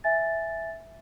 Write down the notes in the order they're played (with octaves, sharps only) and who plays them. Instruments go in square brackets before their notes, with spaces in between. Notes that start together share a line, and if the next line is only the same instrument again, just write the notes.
[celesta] E5 G#5 A6